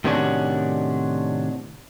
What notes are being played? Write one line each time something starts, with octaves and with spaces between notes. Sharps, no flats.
A2 C3 D#3 C#4 D4 F#4